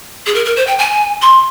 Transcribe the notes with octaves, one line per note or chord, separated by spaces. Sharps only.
G#4
A#4
A#4
C5
G5
G#5
C6